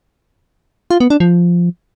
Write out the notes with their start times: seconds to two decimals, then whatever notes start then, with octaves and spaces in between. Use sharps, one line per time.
0.91 F4
1.00 B3
1.10 D4
1.20 F3